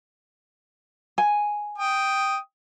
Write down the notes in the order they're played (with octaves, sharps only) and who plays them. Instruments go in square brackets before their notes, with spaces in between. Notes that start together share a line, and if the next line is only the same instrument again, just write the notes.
[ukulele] G#5
[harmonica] G5 D#6